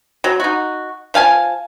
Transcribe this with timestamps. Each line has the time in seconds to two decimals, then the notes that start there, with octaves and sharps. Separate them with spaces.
0.24 F#3
0.40 D#4 F#4
1.14 F3 F5 G#5 A5